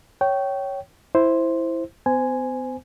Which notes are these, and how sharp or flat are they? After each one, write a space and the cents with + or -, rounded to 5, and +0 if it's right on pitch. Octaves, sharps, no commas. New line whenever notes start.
C#5 +0 G5 -20
E4 +0 C5 +0
B3 +45 C5 -25 G#5 +0